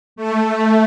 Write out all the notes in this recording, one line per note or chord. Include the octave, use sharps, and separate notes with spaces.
A3